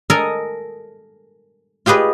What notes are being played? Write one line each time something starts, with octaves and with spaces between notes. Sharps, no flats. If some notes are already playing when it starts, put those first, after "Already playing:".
A4 A#4 D#5 G#5 A#5
F4 G4 G#4 B4 D#5